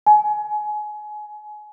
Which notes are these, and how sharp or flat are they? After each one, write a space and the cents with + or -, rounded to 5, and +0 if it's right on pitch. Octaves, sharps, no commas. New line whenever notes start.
G#5 +25